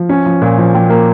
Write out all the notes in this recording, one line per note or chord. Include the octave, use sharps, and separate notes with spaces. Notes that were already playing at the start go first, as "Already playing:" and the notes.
Already playing: F3
C#4
F3
A#2
F3
F3 G5
A#3